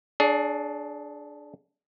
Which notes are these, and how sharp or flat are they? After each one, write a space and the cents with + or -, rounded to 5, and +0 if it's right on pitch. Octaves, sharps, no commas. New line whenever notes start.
D4 +0 G#4 +25 C#5 +45